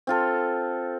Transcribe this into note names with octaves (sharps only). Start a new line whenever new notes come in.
C4 F4 A4